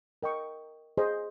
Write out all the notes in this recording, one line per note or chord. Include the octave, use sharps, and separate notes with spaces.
A#4 D#5 G5 C#6
G#4 C5 D#5